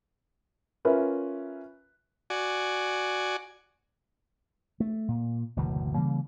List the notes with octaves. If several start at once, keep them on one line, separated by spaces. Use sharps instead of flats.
C#4 F4 A#4 B4 E5
F#4 D5 G#5
A3
A#2
F#1 D2 B2 E3
C#3 E3 G3 A#3